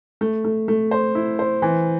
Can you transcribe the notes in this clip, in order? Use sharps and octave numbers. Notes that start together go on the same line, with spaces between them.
A3
A3
A3
C5
E4
C5
E3